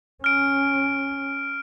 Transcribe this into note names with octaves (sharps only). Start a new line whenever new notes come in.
C#4 F6 D7